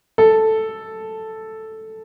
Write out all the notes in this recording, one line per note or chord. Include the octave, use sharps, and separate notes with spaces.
A4